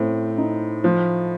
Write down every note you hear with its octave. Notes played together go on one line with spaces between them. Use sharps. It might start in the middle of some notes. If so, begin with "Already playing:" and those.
Already playing: A2 C4
D#4
F3